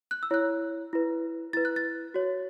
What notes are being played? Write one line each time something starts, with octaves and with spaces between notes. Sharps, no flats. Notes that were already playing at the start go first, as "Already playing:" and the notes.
F#6
E6
E4 C#5 F#6
E4 B4
E4 B4 A6
F#6
A6
F#4 C#5